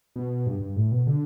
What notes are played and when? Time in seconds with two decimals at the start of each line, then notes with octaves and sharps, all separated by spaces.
0.16 B2
0.46 G2
0.61 G2
0.76 A2
0.92 B2
1.07 D3